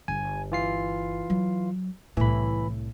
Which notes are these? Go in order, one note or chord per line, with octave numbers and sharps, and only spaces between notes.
G1 G#5
E3 F4 C7
F#3
C2 A2 E3 B5